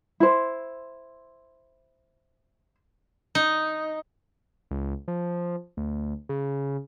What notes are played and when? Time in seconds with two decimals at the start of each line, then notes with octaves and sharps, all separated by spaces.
0.20 E4 C5
3.35 D#4
4.71 C#2
5.08 F3
5.77 D2
6.29 C#3